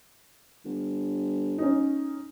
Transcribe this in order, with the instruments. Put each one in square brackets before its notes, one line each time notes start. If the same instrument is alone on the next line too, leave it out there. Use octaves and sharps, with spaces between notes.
[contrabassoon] G1
[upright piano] C#4 D#4